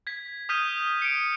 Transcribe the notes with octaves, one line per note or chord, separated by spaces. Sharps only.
G#6 B6
D#6 F6 G6 B6 D#7
C#7 D7